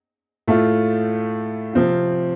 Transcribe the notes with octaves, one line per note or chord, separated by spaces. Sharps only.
A2 A3 F4
C3 F3 C4 F4